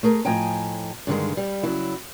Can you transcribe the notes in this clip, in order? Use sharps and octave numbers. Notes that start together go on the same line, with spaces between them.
A3 G#4 A#4
A2 F3 D#5 G5 G#5 A#5
G2 D3 D#3 G#3
G3
C#3 F#3 E4